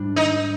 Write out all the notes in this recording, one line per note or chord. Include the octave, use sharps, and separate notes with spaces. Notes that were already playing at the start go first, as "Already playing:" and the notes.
Already playing: G#2 G3 D4
D#4